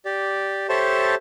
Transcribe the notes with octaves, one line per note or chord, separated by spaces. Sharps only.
G4 D5
G4 A4 C5 C#5 E5 A5